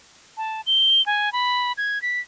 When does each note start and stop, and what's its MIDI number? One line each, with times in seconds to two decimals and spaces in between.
0.37 0.61 81
0.67 1.04 103
1.06 1.32 80
1.33 1.73 83
1.78 2.01 92
2.02 2.20 95